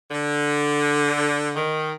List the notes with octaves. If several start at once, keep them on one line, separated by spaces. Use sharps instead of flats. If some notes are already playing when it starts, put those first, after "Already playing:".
D3
D#3